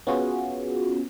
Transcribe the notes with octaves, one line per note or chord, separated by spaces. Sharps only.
B3 C#4 F4 F#4 G#4